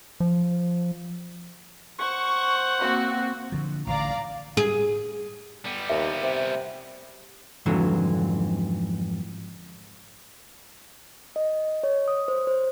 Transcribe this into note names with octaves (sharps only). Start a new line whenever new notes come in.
F3
C5 F#5 C#6
A#3 C4 F#4
D3 F3
A1 D3 D5 F5 A#5
G#4
G3 B3
D#2 E5
C3
F2 G#2 D3 E3 F#3
D#5
C#5
D#6
C5
C5